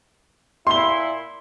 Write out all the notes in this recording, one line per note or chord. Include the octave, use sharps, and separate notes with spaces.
A#2 E4 C6 G7